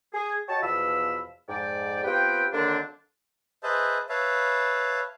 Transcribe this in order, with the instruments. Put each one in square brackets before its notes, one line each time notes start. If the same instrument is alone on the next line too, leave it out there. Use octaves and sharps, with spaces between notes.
[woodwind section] G#4
F#4 C#5 D#5 G5 A5
E2 B2 F3 F4 B5 E6
F2 G#2 D5 G5
B3 C4 F4 G4 B4 G5
D3 D#3 F#3 A#3 C4 D4
[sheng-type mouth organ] G#4 B4 C5 D#5 E5 A5
B4 C#5 E5 F5 A5